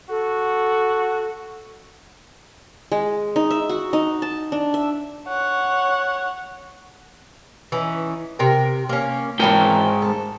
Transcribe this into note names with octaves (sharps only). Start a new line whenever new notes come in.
F#4 A4
G#3
D#4
E5
F#4
D#4
A5
D4
E5
C#5 F#5
E3 C#4 D#4
C3 A#4 G5
A#3 C#4
G#2 E3 C#4 A#4 G5
A4